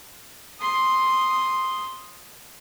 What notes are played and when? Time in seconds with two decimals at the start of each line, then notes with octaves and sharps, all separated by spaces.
0.61 C6 D#6